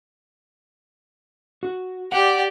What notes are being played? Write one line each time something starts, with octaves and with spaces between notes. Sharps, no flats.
F#4
G4 D5 F#5